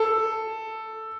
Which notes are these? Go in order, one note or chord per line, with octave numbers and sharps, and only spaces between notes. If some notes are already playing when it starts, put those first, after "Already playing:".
Already playing: A4